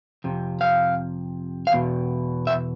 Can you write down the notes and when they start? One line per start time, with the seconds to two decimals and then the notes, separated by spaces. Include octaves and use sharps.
0.24 F2 C3
0.61 F5
1.67 F5
1.72 E2 B2
2.47 E5